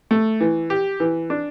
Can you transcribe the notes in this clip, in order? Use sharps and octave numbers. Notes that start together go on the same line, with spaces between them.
A3
E3
G4
E3
D4